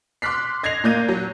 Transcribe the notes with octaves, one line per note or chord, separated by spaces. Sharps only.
C6 D6 F6 F#6 B6 C7
D#5 G#6 A#6 C7 F7
A#2 A#3 G6 D#7
F#3